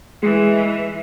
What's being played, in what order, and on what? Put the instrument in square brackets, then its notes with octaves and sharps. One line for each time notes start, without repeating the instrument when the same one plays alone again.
[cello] E3 [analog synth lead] G#3